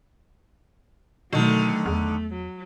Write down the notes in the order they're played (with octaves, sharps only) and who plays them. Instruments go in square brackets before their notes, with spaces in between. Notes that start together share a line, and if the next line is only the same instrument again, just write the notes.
[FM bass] B2 [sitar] D3 D#3 [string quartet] F#3 A3
[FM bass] E2 [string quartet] A3
[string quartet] F#3